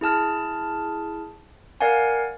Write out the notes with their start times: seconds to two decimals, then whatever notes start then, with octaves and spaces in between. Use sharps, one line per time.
0.01 E4 G#4 A5 F6
1.81 A#4 D5 F5 F#5 G#5